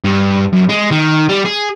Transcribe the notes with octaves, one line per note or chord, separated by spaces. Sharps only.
G2
F#2
G#3
D#3
G3
G#4